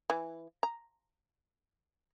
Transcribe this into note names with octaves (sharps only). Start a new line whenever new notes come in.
E3
A#5